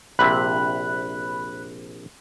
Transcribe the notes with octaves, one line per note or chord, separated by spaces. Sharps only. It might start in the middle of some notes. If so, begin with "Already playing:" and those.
A#1 C3 E5 B5 F#6